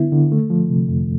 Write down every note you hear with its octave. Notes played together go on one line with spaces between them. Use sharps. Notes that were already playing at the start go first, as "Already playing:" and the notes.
Already playing: D3 B3 E4
D3
A3
F3
C3
F2